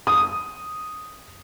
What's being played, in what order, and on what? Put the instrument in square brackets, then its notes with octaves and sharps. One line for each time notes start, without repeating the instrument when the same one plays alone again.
[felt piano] D#6